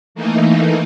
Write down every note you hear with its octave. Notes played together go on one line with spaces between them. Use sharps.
E3 A3 A#3 D#4